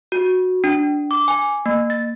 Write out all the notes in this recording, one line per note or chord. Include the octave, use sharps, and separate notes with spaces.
F#4
D4
D6
G#5
A#3
A6